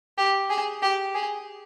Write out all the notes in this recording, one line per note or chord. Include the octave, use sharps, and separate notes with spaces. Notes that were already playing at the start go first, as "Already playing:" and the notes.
G4
G#4
G4
G#4